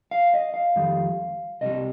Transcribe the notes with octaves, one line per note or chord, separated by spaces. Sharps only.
F5
D#5
F5
F2 D#3 G3
C2 C3 G3 D#5